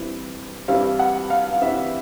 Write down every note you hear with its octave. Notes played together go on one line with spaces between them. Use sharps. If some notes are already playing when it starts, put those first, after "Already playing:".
Already playing: G2 E3 G3 C4 E4
G2 E3 G3 C4 E4 F5
F#5
F5
F5
G2 E3 G3 C4 E4 E5